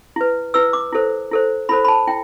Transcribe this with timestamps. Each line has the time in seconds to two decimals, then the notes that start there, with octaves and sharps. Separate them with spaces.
0.16 E4 B4
0.54 E4 B4 E6
0.73 D6
0.93 E4 A4 C5
1.31 E4 A4 C5
1.69 E4 A4 C5 B5
1.84 B5
1.88 A5
2.08 E4 G5